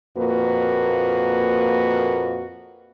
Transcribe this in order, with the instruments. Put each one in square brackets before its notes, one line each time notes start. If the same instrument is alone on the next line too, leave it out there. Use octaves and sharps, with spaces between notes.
[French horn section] F2 A#2 A#3 F#4 B4